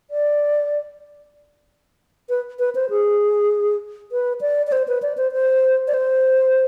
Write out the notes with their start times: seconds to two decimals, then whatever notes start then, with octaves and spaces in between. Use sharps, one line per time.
0.11 D5
2.29 B4
2.59 B4
2.75 C5
2.90 G#4
4.12 B4
4.41 D5
4.67 D5
4.72 C5
4.88 B4
5.02 D5
5.17 C5
5.33 C5
5.88 D5
5.94 C5